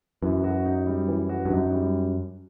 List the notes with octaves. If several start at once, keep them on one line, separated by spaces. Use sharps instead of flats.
F#2 E3
F#4
D#4
G3
E3
F#4
G2
F#2 D#4
G3